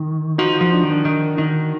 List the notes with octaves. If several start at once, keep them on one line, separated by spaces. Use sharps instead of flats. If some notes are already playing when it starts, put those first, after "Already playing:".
Already playing: D#3
F3 D#4 F#4
F3
D4
D#3 D#4
D4
D#3 D#4
D#3 D#4